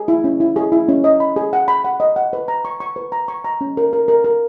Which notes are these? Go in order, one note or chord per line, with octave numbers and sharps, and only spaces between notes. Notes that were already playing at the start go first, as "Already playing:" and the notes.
Already playing: G#4
E4
C#4
E4
G#4
E4
C#4
D#5
B5
G#4
F#5
B5
F#5
D#5
F#5
B4
A#5
C#6
C#6
B4
A#5
C#6
A#5
C#4
A#4
A#4
A#4
A#4